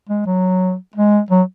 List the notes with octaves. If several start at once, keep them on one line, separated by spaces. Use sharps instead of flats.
G#3
F#3
G#3
F#3